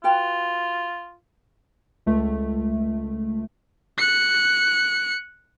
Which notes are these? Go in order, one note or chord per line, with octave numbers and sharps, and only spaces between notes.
F4 F#4 B4 G5
C#2 A3
F#6 C#7